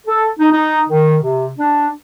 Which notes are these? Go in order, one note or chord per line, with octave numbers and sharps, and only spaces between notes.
A4
D#4
D#4
D#3
C3
D4